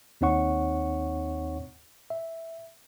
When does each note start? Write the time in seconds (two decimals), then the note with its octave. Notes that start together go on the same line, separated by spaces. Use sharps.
0.21 D#2 C4 D#4 C#5 F#5 C#6
2.10 E5